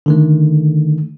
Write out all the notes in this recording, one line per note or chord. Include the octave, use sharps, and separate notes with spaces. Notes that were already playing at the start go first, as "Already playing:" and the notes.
D3 D#3 A3